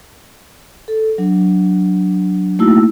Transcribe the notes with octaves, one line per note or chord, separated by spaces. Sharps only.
A4
F#3 D4
A3 A#3 D#4 E4 F#4 E6